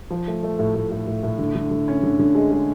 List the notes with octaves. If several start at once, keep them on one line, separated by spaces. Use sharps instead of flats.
F3
A3
A3
A2
A2
A2
A2
A2
D3
D3
D3
C#4
D3
D3
G#3
G#3